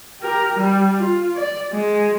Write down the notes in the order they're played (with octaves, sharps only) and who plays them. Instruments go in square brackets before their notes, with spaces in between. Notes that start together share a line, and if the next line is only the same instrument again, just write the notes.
[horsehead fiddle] G4 A#4
G3
F4
D5
G#3